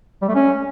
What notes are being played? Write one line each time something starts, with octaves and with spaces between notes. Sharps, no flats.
G3
A3
C#4